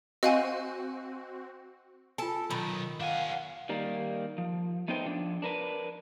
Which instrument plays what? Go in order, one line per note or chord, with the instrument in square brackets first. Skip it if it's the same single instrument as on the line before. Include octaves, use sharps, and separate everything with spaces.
[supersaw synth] C4 F#4 [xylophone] D#5 F5 G#5
[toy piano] F4 G#5 [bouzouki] A4
[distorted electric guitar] B1 [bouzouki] D#3 [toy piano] B5
[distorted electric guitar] D4 G#5 [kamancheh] F5 F#5
[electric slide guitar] D#3 G3 A#3
F3
A3 B3 D#4 A#4 C5 G5
F3 D4
D4 A#4 B4